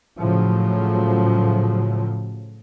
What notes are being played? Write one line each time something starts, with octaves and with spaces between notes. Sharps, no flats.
A2 C#3 F3 F#3